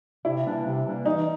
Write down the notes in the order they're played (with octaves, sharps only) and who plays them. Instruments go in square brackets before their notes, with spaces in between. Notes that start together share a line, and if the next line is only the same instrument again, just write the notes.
[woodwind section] C3 [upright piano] E4
[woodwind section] E3 G3 A#3 D4
C3
E3 G3 A#3 D4
[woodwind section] E3 [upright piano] D#4